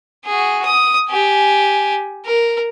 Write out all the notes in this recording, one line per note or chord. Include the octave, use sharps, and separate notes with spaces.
F#4 G#4
D#6
G4 G#5
A#4